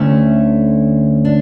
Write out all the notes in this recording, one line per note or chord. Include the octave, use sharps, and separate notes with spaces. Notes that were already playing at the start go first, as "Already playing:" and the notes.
Already playing: D2 D3 A3 C#4 E4
D4